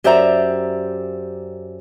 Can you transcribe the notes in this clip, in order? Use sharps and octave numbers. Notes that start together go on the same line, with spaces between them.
F#2 G4 C5 D5 E5 A#5